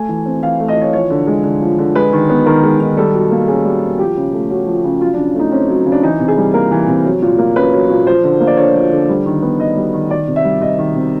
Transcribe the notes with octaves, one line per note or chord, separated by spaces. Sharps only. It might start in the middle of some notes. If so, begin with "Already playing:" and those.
Already playing: A3 G#5
E3
C4
E3 F5
A3
D#5
E3 C#5
F3 C#5
D3
G#3
D3
F3
D3
G#3 B4
D#3
B3
D#3 A#4
G#3
D#3
G3 A4
B2
A#3
C#4 G#4
G3
B2
F3 G4
C#3
A3
C#4 F#4
F3
C#3
F#3 F4
D4
C#3
A3 D#4
C4 C#4
F#3
C#3
D4
E3 D#4
C3
G#4
G3
A#3 A#4
E3
C3
F#3
A#2
A#3
C#4 B4
F#3
A#2
F3 C5
D3
A#3
D5
D3 C#5
F3
D3
G3
D#3
B3
D#3 D#5
G3
D#3
D#3 D5
C3
E5
G3
C3 D#5
D#3
C3